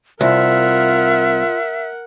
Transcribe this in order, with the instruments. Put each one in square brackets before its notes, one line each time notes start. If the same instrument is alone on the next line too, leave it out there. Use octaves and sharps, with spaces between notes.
[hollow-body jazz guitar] C2 [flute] F4 [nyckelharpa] A#4 F#5 [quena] E5